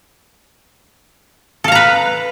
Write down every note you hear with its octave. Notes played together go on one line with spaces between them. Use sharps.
A4 B4 F5 A#5